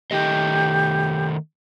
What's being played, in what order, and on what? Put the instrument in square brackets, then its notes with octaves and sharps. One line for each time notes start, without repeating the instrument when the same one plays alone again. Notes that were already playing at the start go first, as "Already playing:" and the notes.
[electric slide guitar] D#3 A3 D#5 [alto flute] G4